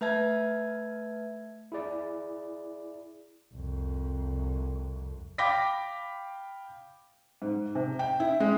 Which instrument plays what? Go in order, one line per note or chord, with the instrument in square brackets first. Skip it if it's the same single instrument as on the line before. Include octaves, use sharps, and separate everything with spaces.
[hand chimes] A3 B4 E5 A5 G#6
[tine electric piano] E4 G#4 D5
[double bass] C2 F2
[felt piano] F5 G5 B5 D6 A#6 B6
G#2
C3
G5
E4
G#3